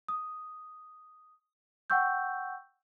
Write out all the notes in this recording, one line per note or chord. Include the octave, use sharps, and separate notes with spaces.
D#6
F#5 G5 C#6 E6 G6